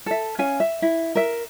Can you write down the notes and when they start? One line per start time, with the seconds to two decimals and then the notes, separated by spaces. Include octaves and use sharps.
0.06 A4 E5
0.39 C#4 F5 G#5
0.60 E5
0.82 E4
1.15 A#4 E5